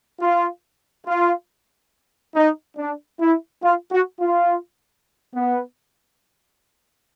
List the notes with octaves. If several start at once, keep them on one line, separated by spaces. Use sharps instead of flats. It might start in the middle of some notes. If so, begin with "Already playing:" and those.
F4
F4
D#4
D4
E4
F4
F#4
F4
B3